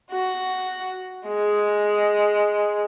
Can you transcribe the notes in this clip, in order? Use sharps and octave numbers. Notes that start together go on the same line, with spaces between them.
F#4
G#3